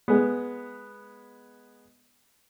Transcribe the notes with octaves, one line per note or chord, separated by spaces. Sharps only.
G#3 B3